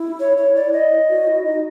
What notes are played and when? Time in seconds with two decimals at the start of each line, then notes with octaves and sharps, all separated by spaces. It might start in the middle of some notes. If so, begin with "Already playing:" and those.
Already playing: E4
0.20 C#5
0.37 C#5
0.56 D5
0.73 D#5
1.09 F#4
1.27 E4
1.44 D#4